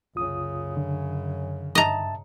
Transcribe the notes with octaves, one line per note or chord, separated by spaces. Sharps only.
C2 F#2 C#3 F4 D#6
D3
G2 D#5 E5 A5 A#5